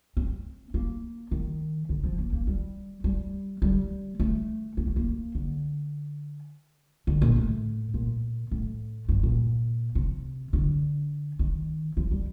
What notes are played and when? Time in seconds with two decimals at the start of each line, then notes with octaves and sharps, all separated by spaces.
0.17 C4
0.74 A#3
1.31 D#3
1.89 D3
2.04 F3
2.18 A#3
2.33 A#3
2.47 G3
3.04 G3
3.62 G3
4.20 A3
4.77 A#3
4.87 A3
4.96 A#3
5.35 D3
7.07 D3
7.21 A#2
7.36 A2
7.94 A#2
8.51 A2
9.09 G2
9.23 A#2
9.95 C3
10.53 D3
11.39 D#3
11.97 F3
12.11 G3